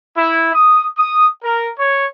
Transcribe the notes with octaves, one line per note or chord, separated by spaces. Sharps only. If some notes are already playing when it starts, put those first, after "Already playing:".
E4
D#6
D#6
A#4
C#5